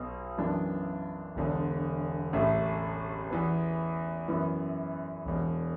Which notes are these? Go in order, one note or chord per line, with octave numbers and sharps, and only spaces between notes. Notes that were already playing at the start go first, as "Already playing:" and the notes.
Already playing: B1 B2 B3
F#2 E3 B3 D4
E1 E2 D3
A1 A2 A3
E2 E3 B3
F#2 E3 B3 E4
E1 E2 B2